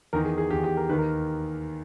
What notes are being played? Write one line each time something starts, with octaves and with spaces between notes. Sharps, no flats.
E2 D#3 A#4
G#4
G#4
E2 D#3 G4
G4
A#4
D#2 D#3 B4
A#4